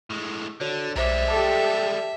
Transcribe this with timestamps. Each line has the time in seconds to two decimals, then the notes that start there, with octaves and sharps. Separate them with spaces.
0.10 A2 G#3
0.61 D3 F#4 C#5
0.96 B1 G3 G#3 C5 E5 D6
1.28 G4 A4 A5 D6